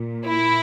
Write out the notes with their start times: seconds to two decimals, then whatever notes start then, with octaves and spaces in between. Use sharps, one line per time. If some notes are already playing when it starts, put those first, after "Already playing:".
Already playing: A#2
0.27 E4